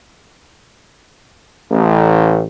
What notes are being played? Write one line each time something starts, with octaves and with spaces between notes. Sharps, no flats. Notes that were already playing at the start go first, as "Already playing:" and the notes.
A1